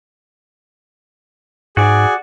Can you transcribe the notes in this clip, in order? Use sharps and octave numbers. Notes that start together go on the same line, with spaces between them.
G#2 F#4 G#4 D5